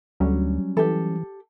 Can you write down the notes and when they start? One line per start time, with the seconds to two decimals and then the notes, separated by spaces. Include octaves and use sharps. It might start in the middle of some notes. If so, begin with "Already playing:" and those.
0.20 D2 F#3 G3 C#4
0.77 E3 G4 A4